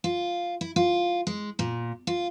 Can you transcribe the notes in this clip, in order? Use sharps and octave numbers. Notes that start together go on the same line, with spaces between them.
F4
E4
F4
G#3
A#2
F4